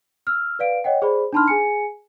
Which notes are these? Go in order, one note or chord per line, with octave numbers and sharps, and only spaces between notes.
E6 F6
B4 D5 F5 D7
C#5 D#5 F#5 G5
G#4 C5 D5 B5
D4 D#4 A5 B5 C6 F6
G#4 G#5 C#7